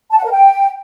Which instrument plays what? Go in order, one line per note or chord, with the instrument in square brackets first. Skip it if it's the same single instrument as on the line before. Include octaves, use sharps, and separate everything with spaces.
[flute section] A5
F#5
A#4
G5